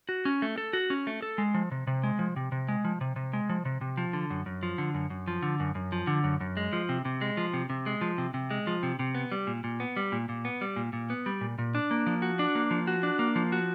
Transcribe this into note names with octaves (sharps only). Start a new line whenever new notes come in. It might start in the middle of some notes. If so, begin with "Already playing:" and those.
F#4
C#4
A3
A4
F#4
C#4
A3
A4
G#3
F3
C3
C3
G#3
F3
C3
C3
G#3
F3
C3
C3
G#3
F3
C3
C3
F3
D3
F#2
F#2
F3
D3
F#2
F#2
F3
D3
F#2
F#2
F3
D3
F#2
F#2
G#3
F3
C3
C3
G#3
F3
C3
C3
G#3
F3
C3
C3
G#3
F3
C3
C3
B3
G3
A#2
A#2
B3
G3
A#2
A#2
B3
G3
A#2
A#2
B3
G3
A#2
A#2
D4
A#3
F3
F#4
D4
A#3
F3
F#4
D4
A#3
F3
F#4